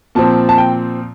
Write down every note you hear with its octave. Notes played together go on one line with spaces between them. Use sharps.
A#2 F3 C4 A5
A5
G5